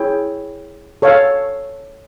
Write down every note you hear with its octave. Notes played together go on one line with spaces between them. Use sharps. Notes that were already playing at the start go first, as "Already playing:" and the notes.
Already playing: E4 G#4 C#5 G5
A4 C#5 F5